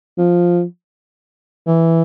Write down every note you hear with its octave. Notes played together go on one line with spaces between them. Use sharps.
F3
E3